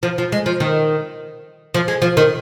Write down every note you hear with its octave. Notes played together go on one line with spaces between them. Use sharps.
F3
F3
G#3
F3
D#3
F3
G#3
F3
D#3